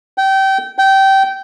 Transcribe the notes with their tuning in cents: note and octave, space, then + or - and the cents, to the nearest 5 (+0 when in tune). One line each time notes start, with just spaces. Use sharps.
G5 -25
G5 -20